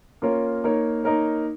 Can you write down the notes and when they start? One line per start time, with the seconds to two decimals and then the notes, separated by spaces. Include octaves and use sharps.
0.22 A#3 C#4 F4 A#4 C#5
0.64 A#3 D#4 A#4 C#5
1.04 A#3 D#4 A#4 C#5